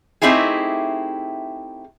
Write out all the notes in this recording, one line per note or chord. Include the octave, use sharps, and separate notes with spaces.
A3 C4 D#4 E4 G4 G#4